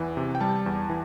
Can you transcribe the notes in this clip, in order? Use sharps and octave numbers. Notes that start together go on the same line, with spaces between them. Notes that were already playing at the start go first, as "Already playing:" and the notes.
Already playing: E2 E3
C3
G5
G3 A5
E2
E3